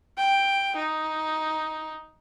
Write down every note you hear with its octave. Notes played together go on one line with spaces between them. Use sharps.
G5
D#4